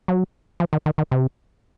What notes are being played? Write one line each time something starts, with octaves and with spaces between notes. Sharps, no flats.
F#3
F3
D#3
D#3
D#3
C3